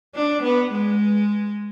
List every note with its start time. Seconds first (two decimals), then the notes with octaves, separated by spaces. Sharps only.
0.15 D4
0.43 B3
0.71 G#3